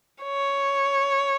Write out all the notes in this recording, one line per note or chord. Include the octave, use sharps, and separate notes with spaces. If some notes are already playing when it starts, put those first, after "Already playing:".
C#5